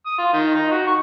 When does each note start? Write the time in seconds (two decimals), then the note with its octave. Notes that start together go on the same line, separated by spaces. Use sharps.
0.06 D#6
0.18 F4
0.33 D#3
0.55 D#4
0.71 F#4
0.87 C#6